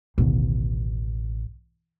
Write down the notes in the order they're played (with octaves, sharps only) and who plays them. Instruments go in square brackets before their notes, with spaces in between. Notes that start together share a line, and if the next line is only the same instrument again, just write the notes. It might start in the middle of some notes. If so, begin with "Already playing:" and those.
[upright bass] A1 [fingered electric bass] D2 B2 D#3